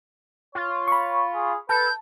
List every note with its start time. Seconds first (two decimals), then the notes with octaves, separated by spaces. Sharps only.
0.55 F4 C#5
0.88 B5 C#6
1.34 G#4
1.69 A4 B4 A5 G6